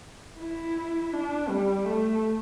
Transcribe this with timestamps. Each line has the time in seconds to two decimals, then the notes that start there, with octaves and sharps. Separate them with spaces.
0.39 E4
1.12 D4
1.49 G3
1.85 A3